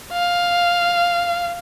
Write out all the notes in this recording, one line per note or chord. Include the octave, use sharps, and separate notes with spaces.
F5